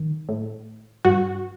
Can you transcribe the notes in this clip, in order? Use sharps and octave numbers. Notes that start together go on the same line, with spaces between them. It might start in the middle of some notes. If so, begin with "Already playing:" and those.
Already playing: D#3
A2
G2 F#4